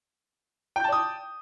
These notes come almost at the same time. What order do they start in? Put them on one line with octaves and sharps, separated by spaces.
G5 G6 A5 D5 D#6